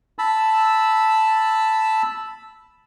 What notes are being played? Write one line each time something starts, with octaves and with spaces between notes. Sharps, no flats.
A5 B5 E6